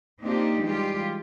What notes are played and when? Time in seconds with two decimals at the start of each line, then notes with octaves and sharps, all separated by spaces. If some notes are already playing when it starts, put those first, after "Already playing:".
0.20 A#3 C4 D4 D#4 F4 G4
0.60 E3 G3 G#3 F4 G4